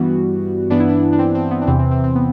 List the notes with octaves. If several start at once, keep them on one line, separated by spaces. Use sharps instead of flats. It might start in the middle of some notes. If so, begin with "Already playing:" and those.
Already playing: G2 E3 G3 B3 F#4
G2 E3 B3 D4
E4
D4
D4
C4
C4
B3
D4
E2 C3 E3 C4
C4
C4
C4
B3